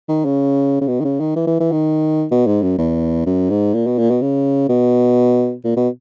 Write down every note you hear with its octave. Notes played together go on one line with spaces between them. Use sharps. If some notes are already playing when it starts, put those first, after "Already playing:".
D#3
C#3
C#3
B2
D#3
C#3
D#3
E3
E3
E3
D#3
B2
G#2
F#2
E2
F#2
G#2
A#2
B2
A#2
B2
C#3
B2
A#2
B2